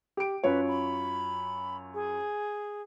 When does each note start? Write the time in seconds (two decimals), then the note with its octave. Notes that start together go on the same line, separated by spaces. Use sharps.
0.17 G4 D7
0.44 F#2 F4 B4 C#5
0.68 B5
1.94 G#4